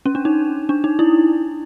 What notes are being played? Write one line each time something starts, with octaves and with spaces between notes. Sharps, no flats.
C#4
D4
D#4
D4
D#4
E4